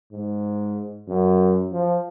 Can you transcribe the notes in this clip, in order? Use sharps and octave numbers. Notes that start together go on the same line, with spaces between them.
G#2
F#2
F3